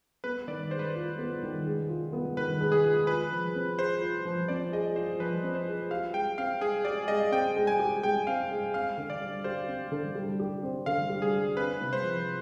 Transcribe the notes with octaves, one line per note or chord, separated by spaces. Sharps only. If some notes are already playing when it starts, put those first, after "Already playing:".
B3 B4
D#3 D5
G#3 C5
B4
C5
F4
B3
D#3
G#3
F4
B3
D#3 B4
G#3
G#4
F4
F4 B4
F3
C4
G#4 C5
F4
F3
C4 D5
G#4 D#5
F4 C5
F3 B4
C4
C5
G#4
G4 F5
G#3 G5
C4 F5
G#3 G#4
G4 D5
G#3 D#5
C4 G5
G#3
G#5
G4
G#3 G5
C4 F5
G#3
C4 F5
D3
D5
G3
G4 C5
C4
D3
G3
G4
C4
D3 F5
G3
G#4
G4
C4 B4
C3
C5
F3